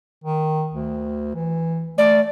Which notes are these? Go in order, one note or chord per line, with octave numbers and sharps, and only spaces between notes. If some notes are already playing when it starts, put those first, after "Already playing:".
D#3
D2
E3
A3 D5